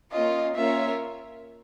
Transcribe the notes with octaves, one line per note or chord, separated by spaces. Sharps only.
A#3 C#4 F4 D#5
A#3 C#4 F4 A#4 C#5 E5